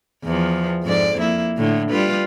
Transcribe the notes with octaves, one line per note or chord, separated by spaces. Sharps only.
E2 F3
F2 G#2 D5
A#3 E4
A2 D3
G3 F4 B4